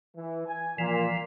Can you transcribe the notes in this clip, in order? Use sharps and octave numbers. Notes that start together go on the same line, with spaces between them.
E3
G#5
A#2 E3 F3